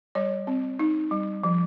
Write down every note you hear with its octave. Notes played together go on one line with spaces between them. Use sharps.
G3 C#5
C4
D#4
G3
F3